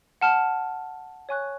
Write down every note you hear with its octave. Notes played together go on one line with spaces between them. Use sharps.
F#5 A5 F6
C#5 G#5 C#6 F#6